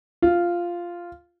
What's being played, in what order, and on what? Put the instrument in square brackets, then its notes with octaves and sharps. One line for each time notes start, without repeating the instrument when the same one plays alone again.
[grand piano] F4